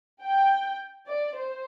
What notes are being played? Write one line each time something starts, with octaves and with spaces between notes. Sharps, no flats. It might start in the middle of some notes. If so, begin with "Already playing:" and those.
G5
D5
C5